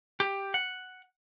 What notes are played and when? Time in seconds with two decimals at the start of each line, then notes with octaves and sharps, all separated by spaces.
0.20 G4
0.54 F#5